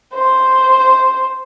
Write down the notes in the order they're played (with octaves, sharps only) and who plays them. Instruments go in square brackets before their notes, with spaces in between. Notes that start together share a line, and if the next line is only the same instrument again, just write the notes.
[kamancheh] C5